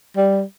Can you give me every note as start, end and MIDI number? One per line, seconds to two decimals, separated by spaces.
0.17 0.43 55